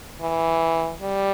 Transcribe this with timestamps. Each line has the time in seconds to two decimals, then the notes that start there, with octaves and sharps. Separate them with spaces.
0.22 E3
1.01 G3